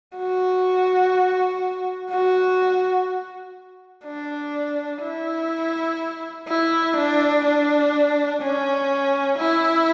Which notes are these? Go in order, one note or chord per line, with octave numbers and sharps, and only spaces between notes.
F#4
F#4
D4
E4
E4
D4
D4
C#4
E4